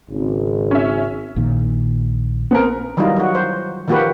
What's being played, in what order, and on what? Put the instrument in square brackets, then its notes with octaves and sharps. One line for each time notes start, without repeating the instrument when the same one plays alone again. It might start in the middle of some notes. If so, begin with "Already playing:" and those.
[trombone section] G#1 C#3
[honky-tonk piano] C#4 E5
[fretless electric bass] A#1 A#2 D#3
[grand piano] B3 C4 A#4
[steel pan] D#3 E3 F#3 G3 D#4 F4
F#3 F#4
C5
D#3 F3 A#3 F#4 G4 B4